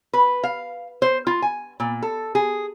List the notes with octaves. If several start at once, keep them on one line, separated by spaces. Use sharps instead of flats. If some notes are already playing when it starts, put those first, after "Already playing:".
B4
F5
C5
F4
G#5
A#2
A4
G#4